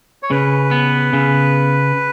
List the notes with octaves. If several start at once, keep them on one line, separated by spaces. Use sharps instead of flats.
C#5
C#3 B4
B3
C#3